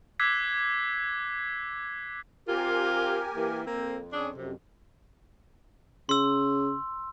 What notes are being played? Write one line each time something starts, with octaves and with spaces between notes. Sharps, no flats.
D6 E6 F#6 G#6 B6 C7
C4 F4 G4 A#4 G#5
E3 A#3
F2 A#3 C4
C#4 D4 G#4
F#2 C3
C#3 C6 E6